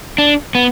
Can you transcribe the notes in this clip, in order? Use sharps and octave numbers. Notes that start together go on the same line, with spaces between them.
D4
B3